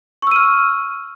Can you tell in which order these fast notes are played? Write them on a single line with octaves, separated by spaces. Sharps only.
C#6 E6 D#7 F6